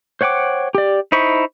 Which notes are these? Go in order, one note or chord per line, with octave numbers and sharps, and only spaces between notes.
C5 C#5 F#5 G5 D6
G4 D5
D#4 E4 C5 B5 C#6